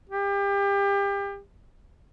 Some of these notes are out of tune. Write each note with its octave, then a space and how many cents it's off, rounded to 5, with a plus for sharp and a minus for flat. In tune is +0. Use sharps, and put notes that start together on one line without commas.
G4 +30